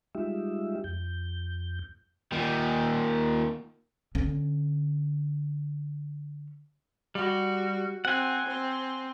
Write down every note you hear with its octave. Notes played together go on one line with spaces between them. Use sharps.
G3 G#3 D#4 F4 G4 E5
F2 G6
A#2 D#3
D3 C#4
G3 F#4
C4 F#5 G#5
C4